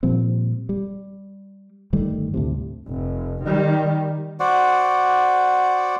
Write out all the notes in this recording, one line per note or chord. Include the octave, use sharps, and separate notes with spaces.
A#2 F3 G3 C4
G3
G1 D#3 G3 A3
D2 A2 C3
F1
D#3 G3
F#4 C5 D5 F#5